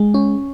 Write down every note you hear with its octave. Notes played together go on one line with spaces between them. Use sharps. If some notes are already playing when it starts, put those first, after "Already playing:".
Already playing: G#3
C#4